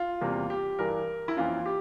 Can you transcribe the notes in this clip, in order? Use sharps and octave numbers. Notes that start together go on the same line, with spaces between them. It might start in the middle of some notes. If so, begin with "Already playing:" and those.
Already playing: F4
E2 C3 G3 A#3
G4
G2 E3 G3 A#4
E4
F2 E3 A#3 C#4 F4
G4